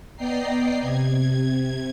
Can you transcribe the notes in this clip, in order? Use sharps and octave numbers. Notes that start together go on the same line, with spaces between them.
B3 D5 D#5 G5 A#5 C7
C3 G#6